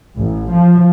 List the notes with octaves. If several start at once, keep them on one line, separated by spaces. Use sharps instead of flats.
A1
F3